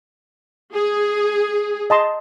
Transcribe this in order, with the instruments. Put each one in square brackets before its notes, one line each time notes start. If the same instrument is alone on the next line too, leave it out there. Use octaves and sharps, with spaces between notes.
[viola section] G#4
[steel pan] D#5 A5 C6